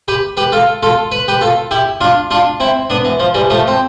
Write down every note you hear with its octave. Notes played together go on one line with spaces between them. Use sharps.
G4 B4
G4 B4
F4 A4
F4 A4
B4
G4 B4
F4 A4
E4 G4
D4 F4
D4 F4
C4 E4
B3 D4
E3
F3
E3 G3
F3 A3
C4